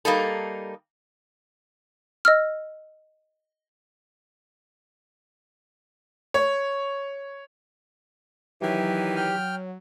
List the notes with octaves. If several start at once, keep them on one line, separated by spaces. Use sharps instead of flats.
G3 A#3 D#4 A4
D#5 E6 F6
C#5
D#3 E3 F#3 G4
G5 F6